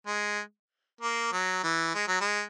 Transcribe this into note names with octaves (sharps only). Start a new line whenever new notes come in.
G#3
A#3
F#3
E3
G#3
F#3
G#3